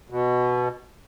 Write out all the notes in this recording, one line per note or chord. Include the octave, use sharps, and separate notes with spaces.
B2